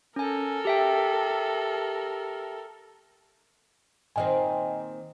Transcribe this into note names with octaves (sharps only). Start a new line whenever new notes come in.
C#4 A4 A#4 G#5
G4 E5 G5
A#2 D#3 C4 D#5 G5 G#5